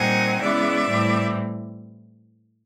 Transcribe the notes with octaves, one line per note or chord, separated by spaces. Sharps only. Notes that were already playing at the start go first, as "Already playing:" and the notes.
Already playing: A#2 G3 C4 D#4 F#5 G#5
C#3 E3 G#3 B3 D5 E5
A2 E3 G3 C4